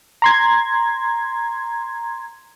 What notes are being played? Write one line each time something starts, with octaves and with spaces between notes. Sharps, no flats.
A#5 C6 G#6